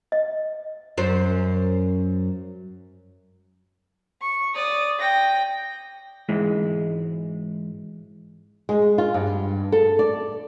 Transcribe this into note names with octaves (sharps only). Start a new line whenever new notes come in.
D#5
F#2 C5
C#6
D5 D#6
G5 A#6
G#2 E3 G#3
G#3
F4
G2
A4
D5